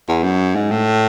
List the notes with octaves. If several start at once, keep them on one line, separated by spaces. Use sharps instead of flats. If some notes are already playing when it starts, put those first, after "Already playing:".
E2
F#2
G#2
A2